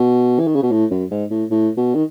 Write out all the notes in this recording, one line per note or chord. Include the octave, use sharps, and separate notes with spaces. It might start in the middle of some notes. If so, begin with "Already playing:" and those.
Already playing: B2
E3
D#3
C#3
B2
A2
F#2
G#2
A2
A2
B2
D#3